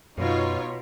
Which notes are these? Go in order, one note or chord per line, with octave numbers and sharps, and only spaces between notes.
F#2 B2 D#4 F4 C#5